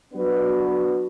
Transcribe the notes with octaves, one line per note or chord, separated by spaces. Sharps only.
F#3 B3 D4 F#4 B4